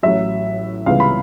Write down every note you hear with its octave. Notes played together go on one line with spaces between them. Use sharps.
A1 A2 F#3 E5
C#2 C3 E3 G3 B3 F5
B5